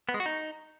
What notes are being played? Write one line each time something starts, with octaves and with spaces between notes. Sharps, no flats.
B3
G#3
F#4
D#4